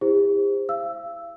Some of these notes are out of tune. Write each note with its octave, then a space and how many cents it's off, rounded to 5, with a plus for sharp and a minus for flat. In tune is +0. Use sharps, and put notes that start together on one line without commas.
E4 +0 G4 +45 C5 +0
F5 -40 E6 +0